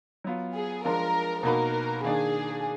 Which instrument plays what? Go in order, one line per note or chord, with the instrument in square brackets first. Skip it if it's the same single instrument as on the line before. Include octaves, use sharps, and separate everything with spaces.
[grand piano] F#3 B3 F4
[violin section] G#4
[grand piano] F3 G#3 D4 F4 [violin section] A#4
[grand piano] B2 A#3 D#4 F#4 B4 [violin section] A#4
[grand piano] D#3 A#3 D4 [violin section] G#4